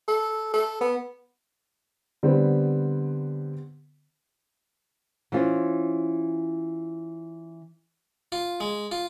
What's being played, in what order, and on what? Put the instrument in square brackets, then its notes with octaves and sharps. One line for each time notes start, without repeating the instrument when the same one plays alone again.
[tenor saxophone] A4
A4
B3
[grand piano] D3 G3 B3 C4
[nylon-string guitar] E3 C#4 F4 C5
[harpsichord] F4
G#3
F4